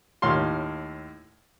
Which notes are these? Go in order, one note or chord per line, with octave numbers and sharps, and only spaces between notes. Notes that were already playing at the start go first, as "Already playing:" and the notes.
D#2 A2 C#5 F5 C6